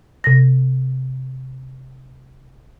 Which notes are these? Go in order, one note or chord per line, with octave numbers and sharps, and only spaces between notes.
C3 A#6